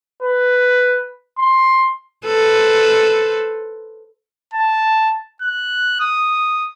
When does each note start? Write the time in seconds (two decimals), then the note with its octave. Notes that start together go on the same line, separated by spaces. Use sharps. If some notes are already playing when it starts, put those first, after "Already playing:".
0.23 B4
1.39 C6
2.26 A4 B4 C5
4.53 A5
5.42 F#6
6.00 D#6